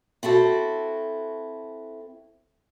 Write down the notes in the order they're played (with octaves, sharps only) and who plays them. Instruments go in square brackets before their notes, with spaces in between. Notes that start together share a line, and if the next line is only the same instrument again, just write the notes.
[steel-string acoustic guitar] C4 E4 F#4 A4